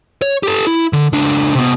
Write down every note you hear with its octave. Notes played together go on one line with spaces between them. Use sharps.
C#5
G4 A4
E4
D3
C#2 D4
C3 B3